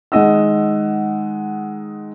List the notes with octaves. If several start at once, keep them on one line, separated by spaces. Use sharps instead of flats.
D#3 G#3 D#4 D#5 F#5 E6